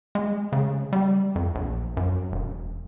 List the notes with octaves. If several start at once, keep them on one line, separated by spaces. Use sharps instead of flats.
G#3
C#3
G3
F2
A#1
F#2
E1